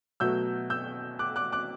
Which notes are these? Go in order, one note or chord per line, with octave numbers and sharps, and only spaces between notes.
B2 F#3 A3 E6 G6
E6 G6
D6 F#6
D6 F#6
D6 F#6